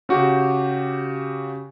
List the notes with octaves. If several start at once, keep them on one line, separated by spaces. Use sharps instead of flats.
C#3 F#4 G4